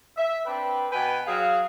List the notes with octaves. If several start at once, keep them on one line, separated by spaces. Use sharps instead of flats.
E5
C4 D4 B4 G5 B5
B2 B4 G5 G#5
F#3 G#4 F5